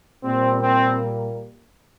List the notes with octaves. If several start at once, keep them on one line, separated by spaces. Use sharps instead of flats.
A#2 G3 A#3 C4
C4